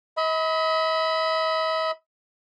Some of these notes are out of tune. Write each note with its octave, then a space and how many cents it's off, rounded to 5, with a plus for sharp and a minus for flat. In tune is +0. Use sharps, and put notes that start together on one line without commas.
D#5 +45 B5 +10